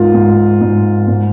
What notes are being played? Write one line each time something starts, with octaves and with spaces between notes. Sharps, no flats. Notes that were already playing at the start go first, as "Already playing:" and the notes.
Already playing: G#2 D#3 F4
G#2
G#2
G#2